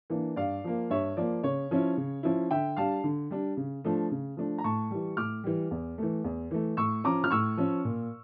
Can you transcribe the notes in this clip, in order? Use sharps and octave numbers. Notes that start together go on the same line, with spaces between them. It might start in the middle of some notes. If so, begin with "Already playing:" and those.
E3 A#3 D4
G2 D5 F5
F3 A#3
G2 C#5 E5
F3 A#3 D5
C#3 C#5
F3 C#4 E4
C#3
F3 C#4 E4
D3 E5 G5
G3 D4 F5 A5
D3
G3 D4
C#3
F3 A3 D4
C#3
F3 A3 D4
A#5
A2 A5 C#6
E3 G3
A2 D6 F6
E3 G3
E2
E3 A3
E2
E3 A3
A2 C#6 E6
F3 C#4 A#5 D6
F6
A2 C#6 E6
F3 C#4
A#2